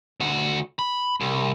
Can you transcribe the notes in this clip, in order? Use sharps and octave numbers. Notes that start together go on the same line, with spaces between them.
D2 F#4
B5
C2